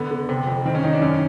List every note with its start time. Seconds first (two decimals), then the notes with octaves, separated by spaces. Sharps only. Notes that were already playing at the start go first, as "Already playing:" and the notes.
Already playing: D3 B3
0.11 D3
0.29 C3
0.47 F2
0.65 D#3 C4
0.75 C#4
0.83 D#3 D#4
0.93 D4
1.01 F#2 C#4